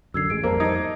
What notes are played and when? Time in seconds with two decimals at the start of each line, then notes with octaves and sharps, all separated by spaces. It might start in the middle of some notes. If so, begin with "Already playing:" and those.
0.14 F#2 D3 E6 G#6 C7
0.30 A1 G#3 D7
0.43 F2 G3 A#3 C5 A5
0.60 D#4 G#6